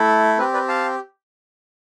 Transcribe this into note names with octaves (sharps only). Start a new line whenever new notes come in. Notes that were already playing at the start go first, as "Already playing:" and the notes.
Already playing: A3 E4 A4
C4 G4 B4
B4 D5
F5 A5